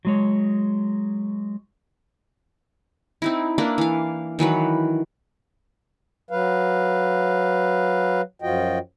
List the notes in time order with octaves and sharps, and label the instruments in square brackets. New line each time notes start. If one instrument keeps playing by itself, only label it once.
[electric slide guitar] F#3 G#3 C#5
[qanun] C4 D#4 E4
A#3 D4 E4 B4
E3 F5
D#3 E3 F#3 B4
[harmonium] F#3 B4 F5
F#2 F3 F4 F#4 D#5 G5